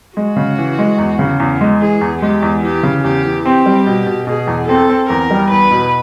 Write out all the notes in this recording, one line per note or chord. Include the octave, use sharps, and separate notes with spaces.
G#3 F#4
C#3
E3
G#3
E2
C#3
E2
G#3
E3 G#4
E2
G#3 G4
E2
E3 G4
C#3
E2 G4
E3
C4 G4
G3
B2
B2
B2 G#4
E2
C4 A4
C4
E2 A#4
G3
E2 B4
B2